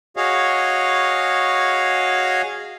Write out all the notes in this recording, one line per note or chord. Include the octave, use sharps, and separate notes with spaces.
F#4 G#4 C#5 D#5 F5